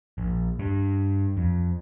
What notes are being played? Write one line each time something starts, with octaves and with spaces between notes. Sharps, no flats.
A#1
G2
F2